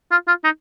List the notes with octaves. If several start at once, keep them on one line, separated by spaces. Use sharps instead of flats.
F4
F4
D#4